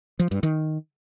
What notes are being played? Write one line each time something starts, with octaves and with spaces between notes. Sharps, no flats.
F3
G2
D#3